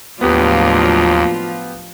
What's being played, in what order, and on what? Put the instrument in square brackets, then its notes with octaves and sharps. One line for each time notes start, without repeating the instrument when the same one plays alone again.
[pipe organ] D#2 [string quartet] A2 F#3 D4 [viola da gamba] F3 F4 [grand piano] B3 G4